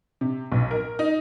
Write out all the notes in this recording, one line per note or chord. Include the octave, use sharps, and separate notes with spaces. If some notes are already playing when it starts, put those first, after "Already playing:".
C3
B1
A#4
D#4